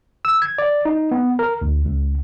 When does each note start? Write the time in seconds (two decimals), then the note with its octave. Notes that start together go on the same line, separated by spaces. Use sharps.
0.25 E6
0.42 G#6
0.58 D5
0.85 D#4
1.11 B3
1.39 A#4
1.62 D2
1.85 C#2